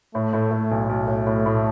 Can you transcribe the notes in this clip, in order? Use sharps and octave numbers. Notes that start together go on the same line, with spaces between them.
A2 A3
A2
A2
B1
B1
A2
A2 A3
A2